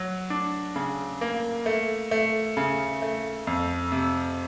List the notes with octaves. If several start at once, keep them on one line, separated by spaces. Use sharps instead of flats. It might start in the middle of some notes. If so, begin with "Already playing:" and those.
Already playing: F#3
D4
C#3
A#3
A3
A3
C#3
A3
F2
C3